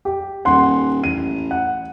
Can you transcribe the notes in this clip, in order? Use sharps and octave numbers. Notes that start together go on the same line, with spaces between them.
G4
D#1 F#5 C6
A1 D#7
F#5